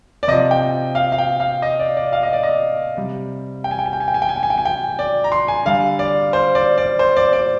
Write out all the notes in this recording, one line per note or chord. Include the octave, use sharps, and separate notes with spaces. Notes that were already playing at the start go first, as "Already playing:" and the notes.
D5
C3 F3 D#5
G5
F5
F5
G5
F5
D#5
D5
D5
F5
D#5
D5
D#5
C3 G3
G5
G#5
G5
G#5
G5
G#5
G5
G#5
G5
G#5
G5
G#5
G5
G#5
G5
D5
A#5
C6
G#5
D3 G3 F5
D5
C5
D5
D5
C5
D5
D5